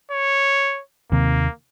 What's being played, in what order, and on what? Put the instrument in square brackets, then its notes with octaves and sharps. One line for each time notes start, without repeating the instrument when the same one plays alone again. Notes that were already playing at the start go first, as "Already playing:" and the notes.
[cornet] C#5
[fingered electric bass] D#2 C3 [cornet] A#3